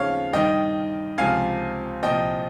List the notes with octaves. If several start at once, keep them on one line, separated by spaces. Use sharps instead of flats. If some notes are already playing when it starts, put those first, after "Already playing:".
Already playing: D#2 C#3 F3 C#5 F5
G2 D#3 D#5 G5
C#2 C3 F3 F5 G#5
C2 A#2 F3 D#5 G5